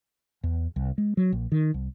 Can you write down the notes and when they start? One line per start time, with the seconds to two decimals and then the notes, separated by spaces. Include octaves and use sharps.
0.43 E2
0.76 C2
0.98 G#3
1.17 F#3
1.32 A#1
1.52 D#3
1.74 C2